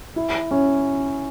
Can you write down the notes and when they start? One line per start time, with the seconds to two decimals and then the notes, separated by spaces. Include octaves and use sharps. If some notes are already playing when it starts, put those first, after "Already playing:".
0.16 E4
0.51 C#4